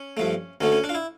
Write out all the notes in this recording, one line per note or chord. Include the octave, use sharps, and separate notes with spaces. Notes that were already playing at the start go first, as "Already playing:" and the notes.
Already playing: C#4
G2 F3 A3
D2 D3 A3 C#4
C#4
D4
F4
E4